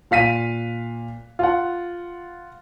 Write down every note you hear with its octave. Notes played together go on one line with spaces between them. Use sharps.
A#2 F5 B6 D#7
F4 F#5